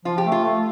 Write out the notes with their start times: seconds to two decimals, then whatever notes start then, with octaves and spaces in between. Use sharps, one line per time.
0.05 F3 F4
0.18 G4
0.25 A3
0.32 F4
0.44 A3